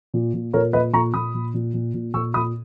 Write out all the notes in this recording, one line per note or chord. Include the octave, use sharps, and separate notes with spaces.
A#2
A#2
A#2 A#4 C#5
A#2 B4 D#5
A#2 A#5 C#6
A#2 B5 D#6
A#2
A#2
A#2
A#2
A#2 C#6 E6
A#2 B5 D#6